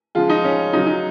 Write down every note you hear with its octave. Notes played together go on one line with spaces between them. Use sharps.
C#3 F3 G#3 F4
D#4
C#4
C#3 F#3 D#4
D#4